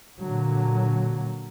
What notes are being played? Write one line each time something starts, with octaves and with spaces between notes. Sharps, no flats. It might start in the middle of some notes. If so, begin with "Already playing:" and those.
A#2 D3 F#3